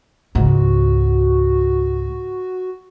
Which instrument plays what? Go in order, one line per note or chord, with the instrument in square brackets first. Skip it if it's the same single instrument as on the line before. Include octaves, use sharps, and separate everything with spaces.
[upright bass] C#2 G#2 [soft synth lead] F#4